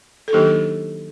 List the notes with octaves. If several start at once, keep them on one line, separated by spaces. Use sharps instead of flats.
A4
D#3 F#3 A#3 D4 D#4 G4